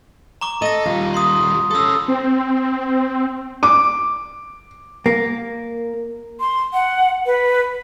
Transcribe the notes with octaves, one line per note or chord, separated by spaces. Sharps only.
A#5 C#6 D6
A4 D#5 A#6 D#7
D#2 G3 F4
C6 D#6
C#4 A4 D#6 E6
C4
D6
A#3
C6
F#5
B4